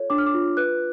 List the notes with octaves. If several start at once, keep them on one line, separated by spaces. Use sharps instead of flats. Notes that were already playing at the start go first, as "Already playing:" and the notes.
Already playing: F4 A4 C#5
D4 D6
F6
D6
F4
B4 F#6